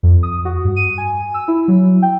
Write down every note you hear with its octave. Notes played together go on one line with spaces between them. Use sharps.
F2
D#6
F#4
G2
D#7
G#5
E6
E4
F#3
G5